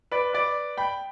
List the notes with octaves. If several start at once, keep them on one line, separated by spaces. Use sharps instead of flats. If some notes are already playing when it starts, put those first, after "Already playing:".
B4 D5
B4 D5
G5 B5